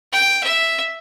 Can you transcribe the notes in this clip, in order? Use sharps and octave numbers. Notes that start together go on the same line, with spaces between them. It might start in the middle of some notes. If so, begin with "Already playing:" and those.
G5
E5